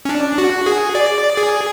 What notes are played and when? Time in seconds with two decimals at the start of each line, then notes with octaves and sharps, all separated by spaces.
0.05 C#4
0.09 D4
0.38 F#4
0.66 G#4
0.95 D5
1.37 G#4